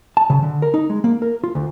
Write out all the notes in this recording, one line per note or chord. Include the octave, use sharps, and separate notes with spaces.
A5
C#3
D3
A#4
D#4
G#3
A#3
A#4
F4
D2